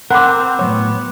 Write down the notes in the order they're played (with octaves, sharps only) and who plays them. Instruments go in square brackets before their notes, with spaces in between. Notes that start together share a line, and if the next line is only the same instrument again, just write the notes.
[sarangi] C4 [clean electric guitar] A#4 [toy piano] F#5 B5 [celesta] D6 F#6
[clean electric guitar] A2 F#3 C#5 [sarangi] B3